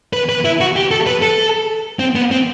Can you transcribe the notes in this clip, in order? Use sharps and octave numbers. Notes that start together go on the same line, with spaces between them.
B4
B4
E4
F#4
G4
A4
B4
A4
C4
B3
C4